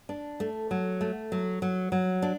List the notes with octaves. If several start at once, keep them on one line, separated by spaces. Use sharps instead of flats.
D4
A3
F#3
A3
F#3
F#3
F#3
D4